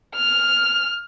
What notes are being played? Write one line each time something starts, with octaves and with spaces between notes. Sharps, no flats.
F6